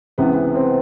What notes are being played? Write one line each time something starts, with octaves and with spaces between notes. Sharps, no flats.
C#2 C3 E3 B3
C4
B3